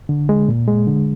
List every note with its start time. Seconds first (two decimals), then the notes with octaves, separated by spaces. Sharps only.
0.09 D3
0.29 G#3
0.49 A#2
0.68 G#3
0.87 D3